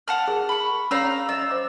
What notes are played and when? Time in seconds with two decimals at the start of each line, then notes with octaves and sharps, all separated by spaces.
0.08 F#5 A5 F6
0.28 G#4 A#4
0.49 B5 C#6
0.91 C#4 C#5 F5 A#5 E6
1.29 D#5 E5 E6
1.50 C5 D6